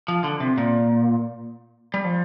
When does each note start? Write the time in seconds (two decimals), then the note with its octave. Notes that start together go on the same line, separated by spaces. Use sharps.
0.08 F3
0.24 D3
0.40 C3
0.58 A#2
1.94 G3
2.04 F3